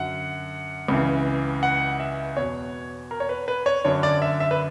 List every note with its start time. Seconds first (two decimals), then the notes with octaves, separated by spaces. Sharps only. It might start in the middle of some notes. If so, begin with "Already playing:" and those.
Already playing: F#2 D3 F#5
0.88 C#2 C#3 E3
1.63 F#5
2.00 E5
2.37 E2 B2 C#5
3.11 A#4
3.20 C#5
3.29 B4
3.48 B4
3.66 C#5
3.85 F#2 D3 C#5
4.03 D5
4.22 E5
4.40 E5
4.51 B4